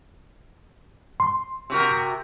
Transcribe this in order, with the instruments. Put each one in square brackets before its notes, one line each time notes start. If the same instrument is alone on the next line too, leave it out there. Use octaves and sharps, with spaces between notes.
[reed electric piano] C6
[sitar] C3 F#4 A#4